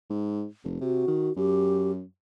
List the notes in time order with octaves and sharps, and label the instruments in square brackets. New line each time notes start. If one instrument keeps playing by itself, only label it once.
[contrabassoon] G#2
F1
[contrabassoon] C3 [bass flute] F#4
[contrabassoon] D#3
[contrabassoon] F#2 [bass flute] G4